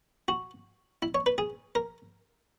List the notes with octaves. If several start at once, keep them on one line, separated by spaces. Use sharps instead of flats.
F#4
E4
C#5
B4
G#4
A#4